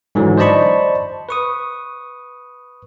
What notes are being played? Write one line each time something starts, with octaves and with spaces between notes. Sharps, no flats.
G#2 D3 E3 F#3
C5 D5 D#5 A5 B5 C#6
B4 C#6 D#6